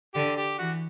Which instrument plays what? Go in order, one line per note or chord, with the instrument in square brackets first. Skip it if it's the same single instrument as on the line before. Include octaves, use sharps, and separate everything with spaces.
[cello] D3 [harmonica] G4
[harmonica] G4
[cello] E3 [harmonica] F#4